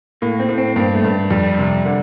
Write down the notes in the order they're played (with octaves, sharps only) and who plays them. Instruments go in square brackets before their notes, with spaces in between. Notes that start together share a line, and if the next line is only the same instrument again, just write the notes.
[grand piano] A2 [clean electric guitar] A#3
[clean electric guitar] C4
[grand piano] A2
[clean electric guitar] C4
[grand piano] G2 [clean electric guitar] A#3
[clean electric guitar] A3
[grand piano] G2
[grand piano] F2 [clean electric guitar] G3
[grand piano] C3
D3